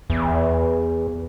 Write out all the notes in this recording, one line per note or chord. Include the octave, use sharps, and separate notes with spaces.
E2